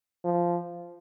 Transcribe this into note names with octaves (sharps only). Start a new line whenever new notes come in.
F3